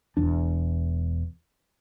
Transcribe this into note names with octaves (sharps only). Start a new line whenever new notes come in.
E1 E2 D4